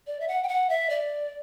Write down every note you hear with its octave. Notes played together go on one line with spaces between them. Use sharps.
D5
E5
F#5
G5
F#5
E5
D5